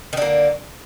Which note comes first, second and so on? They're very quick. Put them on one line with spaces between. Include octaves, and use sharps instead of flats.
D#3 D3 A#3